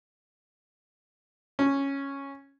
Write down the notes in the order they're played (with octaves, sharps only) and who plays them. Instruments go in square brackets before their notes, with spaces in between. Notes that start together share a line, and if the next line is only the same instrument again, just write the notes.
[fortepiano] C#4